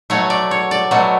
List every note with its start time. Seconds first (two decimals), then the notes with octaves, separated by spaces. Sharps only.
0.10 B2 F#3 A3 C#5
0.30 D5
0.51 C#5
0.71 D5
0.91 B2 F#3 A3